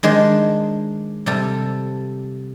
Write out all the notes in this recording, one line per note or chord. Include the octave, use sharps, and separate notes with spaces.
D#3 G#3 D4 C5 C6
C3 G3 A4